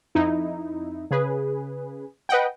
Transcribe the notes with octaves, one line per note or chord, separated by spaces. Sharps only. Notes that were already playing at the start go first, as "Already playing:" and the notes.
F2 D#4 E4
C#3 G#4 B4
B4 D#5 F#5 G5